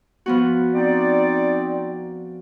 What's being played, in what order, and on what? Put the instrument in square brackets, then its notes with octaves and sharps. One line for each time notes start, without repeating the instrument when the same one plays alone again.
[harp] F3 B3 F#4
[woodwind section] C4 D#4 D5